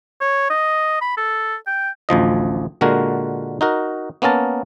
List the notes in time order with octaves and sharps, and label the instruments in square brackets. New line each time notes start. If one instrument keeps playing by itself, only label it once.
[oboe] C#5
D#5
B5
A4
G5
[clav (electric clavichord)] A1 D2 F3 D#5
A#2 D3 G#3 F#4 A#4
D#4 F#4 A#4
A#3 B3 C#4 A#4 A5